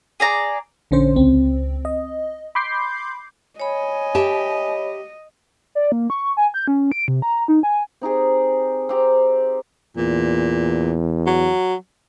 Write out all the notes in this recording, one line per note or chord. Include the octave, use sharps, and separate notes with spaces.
G#4 D5 A#5
A#1 D3 C#4 C5
C#2 C4
D#5
B5 C6 D6 G6 C7
C#5 D#5 G#5 B5
G4 E5 A5
D5
A#3
C#6
G#5
G6
C#4
D7
C3
A#5
D#4
G#5
C4 D#4 G4 G#4
C4 G4 A#5
E2 A#2
F#3